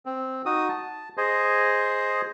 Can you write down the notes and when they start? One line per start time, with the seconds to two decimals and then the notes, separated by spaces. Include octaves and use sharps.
0.06 C4
0.46 D#4 F#4 D#6
0.69 A5
1.17 G#4 C5 D#5